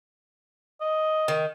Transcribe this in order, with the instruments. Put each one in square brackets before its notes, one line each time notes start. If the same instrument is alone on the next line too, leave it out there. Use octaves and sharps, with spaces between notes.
[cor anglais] D#5
[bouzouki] D#3